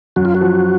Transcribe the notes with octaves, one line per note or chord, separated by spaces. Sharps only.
F#2 F#4
F4
F#4
F3